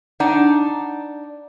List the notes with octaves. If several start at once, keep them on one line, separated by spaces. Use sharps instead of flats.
D4 D#4 F#5